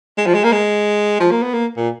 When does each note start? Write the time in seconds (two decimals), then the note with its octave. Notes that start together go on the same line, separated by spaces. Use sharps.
0.18 G#3
0.26 F3
0.34 G#3
0.44 A#3
0.52 G#3
1.20 F3
1.31 A#3
1.43 B3
1.54 A#3
1.77 A#2